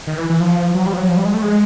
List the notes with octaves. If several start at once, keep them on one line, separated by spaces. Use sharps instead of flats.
D#3
E3
E3
F3
F#3
G3
F3
F#3
F3
G3
G#3
A3
G#3